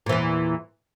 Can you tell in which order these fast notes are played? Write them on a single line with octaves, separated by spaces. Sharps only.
A#2 E3 E2